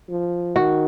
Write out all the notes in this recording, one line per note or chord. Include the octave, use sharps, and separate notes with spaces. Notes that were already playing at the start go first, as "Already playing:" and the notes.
F3
D#3 F#4